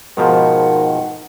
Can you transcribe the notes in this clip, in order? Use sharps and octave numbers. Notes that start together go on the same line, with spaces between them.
G#2 B2 D#3 F3 F#5